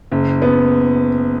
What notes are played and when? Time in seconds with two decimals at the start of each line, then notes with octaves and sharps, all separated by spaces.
0.12 F#1
0.42 B3